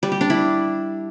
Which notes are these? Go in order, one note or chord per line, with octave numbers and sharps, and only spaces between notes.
G3
G4
D4
E4